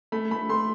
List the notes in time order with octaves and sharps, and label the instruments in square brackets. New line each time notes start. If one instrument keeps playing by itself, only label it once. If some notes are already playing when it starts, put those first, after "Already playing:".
[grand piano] A3 [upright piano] B5
[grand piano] A3 [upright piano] B5
[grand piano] A3 [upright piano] C6